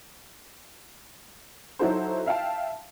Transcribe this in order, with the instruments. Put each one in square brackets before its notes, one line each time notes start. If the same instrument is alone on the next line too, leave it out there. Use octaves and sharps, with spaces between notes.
[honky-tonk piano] F#3 D#4 E4 F#4 A4 C5
E5 F5 G5 A5